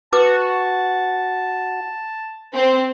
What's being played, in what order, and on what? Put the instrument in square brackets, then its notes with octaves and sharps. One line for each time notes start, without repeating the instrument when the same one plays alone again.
[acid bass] F#4 [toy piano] B4 D6 [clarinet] A5
[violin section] C4